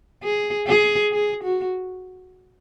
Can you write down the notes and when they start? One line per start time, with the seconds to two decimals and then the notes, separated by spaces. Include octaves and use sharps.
0.23 G#4
0.68 G#4
1.12 G#4
1.44 F#4